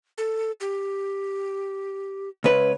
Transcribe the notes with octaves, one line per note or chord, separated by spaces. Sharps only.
A4
G4
C#2 B4 C#5